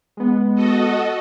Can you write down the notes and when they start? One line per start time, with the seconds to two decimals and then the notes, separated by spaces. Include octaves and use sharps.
0.17 G#3 B3
0.55 F#4 A4 D#5